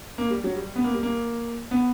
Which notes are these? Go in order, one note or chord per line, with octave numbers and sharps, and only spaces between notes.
A#3
G3
F#3
G3
B3
A#3
G3
A#3
B3